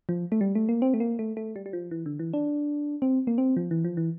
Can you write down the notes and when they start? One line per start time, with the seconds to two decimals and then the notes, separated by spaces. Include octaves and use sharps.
0.09 F3
0.32 A3
0.41 G3
0.55 A3
0.69 A#3
0.82 C4
0.94 A3
1.00 A#3
1.19 A3
1.37 A3
1.56 G3
1.66 G3
1.73 F3
1.91 E3
2.06 D3
2.19 E3
2.33 D4
3.02 C4
3.27 A#3
3.38 C4
3.57 F3
3.71 E3
3.85 F3
3.97 E3